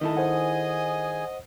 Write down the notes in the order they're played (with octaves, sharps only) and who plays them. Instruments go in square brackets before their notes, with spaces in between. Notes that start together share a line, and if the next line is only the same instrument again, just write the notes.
[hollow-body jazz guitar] D#3 E4 A4 [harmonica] D#5
[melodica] G#4 G#5 [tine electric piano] C5 F#5